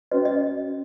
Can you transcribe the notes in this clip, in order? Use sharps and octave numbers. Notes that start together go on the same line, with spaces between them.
C#4 F#4 B4 D#5
D#5